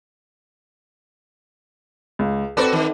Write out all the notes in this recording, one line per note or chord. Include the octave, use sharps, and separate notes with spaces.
C#2
C4 F#4 A4 B4 D5
D#3